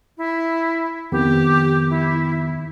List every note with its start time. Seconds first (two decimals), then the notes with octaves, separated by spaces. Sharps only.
0.18 E4
1.12 F2 D#3 B3 G4
1.90 E4